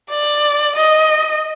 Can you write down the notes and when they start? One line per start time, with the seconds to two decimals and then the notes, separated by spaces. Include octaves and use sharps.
0.10 D5
0.76 D#5